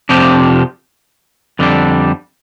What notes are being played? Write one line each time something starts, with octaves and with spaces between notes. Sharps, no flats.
F2 C3 F3 D4 G4
F2 D3 G3 D4